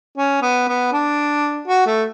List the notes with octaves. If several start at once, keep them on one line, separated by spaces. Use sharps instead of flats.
C#4
B3
B3
D4
F#4
A3